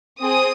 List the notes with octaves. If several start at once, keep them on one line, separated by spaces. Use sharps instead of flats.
C4 G#4 D#6